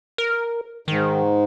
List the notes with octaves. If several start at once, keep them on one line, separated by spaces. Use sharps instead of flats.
A#4
G#2 D#3